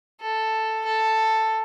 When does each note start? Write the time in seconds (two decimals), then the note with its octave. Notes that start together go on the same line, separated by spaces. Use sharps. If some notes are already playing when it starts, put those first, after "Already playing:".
0.21 A4
0.86 A4